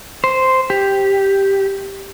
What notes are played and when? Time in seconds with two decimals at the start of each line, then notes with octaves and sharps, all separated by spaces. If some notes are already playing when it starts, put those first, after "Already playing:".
0.24 C5
0.70 G4